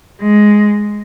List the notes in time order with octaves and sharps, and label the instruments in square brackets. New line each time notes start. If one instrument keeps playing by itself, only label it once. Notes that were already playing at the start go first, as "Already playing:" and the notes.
[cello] G#3